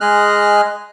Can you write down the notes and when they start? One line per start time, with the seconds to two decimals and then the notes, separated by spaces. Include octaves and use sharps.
0.01 G#3 G#4 D#5 F6 F#6